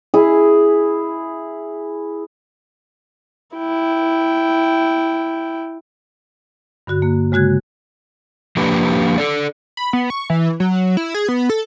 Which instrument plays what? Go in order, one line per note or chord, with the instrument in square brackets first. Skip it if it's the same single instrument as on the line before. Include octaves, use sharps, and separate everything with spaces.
[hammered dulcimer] E4 G#4
[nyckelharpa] E4 G5
[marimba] G2 D3 F#4 F#6
A#3
C#3 G#3 F#4 F#6 G#6
[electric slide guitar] F3 A#3 D4 G4 B4
A4 D5
[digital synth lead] B5
B3
C#6
E3
F#3
E4
G#4
B3
A4